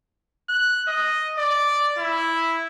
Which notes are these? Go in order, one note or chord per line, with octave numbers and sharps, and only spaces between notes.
F#6
D#5
D5
E4